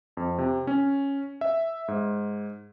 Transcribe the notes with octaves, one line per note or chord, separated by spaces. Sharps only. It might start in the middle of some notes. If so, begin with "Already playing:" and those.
F2
C3
C#4
E5
G#2